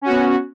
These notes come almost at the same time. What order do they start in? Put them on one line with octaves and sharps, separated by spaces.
C#4 F#4 B3